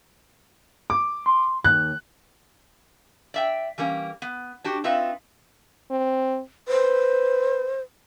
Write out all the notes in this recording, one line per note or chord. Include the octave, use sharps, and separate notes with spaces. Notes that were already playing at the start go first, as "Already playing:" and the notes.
D6
C6
D#2 F#6
D5 E5 G5
E3 G3 A#3 C#4
B3
D4 F#4 G4
C4 D#4 F4 B4 E5
C4
B4 C5